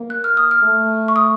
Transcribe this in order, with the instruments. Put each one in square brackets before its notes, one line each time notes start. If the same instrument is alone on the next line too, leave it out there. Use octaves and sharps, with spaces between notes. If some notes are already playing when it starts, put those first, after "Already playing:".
Already playing: [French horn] A#3
[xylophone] F#6
F6
D#6
F6
[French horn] A3
[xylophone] C#6
D#6